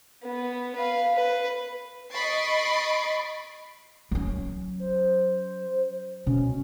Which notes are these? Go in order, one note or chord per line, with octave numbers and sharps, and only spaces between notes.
B3
B4 F5
B4
D#5 B5 C#6 A6 C7 D7
F#3 C#4
C5
B2 C#4